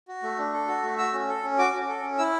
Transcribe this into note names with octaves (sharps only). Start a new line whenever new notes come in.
F#4
A3
D4
A4
F#4
A3
F#4 E6
C#4
A4
C#4
F#4 D6
C#4
A4
C#4
E4 E6